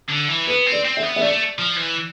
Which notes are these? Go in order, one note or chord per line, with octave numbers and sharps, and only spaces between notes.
D3
E3
B3 B4
C4
D5
C4
E5
B3
E5
A3 D5
F3
E3